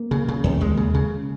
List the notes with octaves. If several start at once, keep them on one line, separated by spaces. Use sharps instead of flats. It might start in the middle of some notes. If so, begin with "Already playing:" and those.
Already playing: A#3
C#3
C#3
D#2
D#2 G#3
C#3
C#3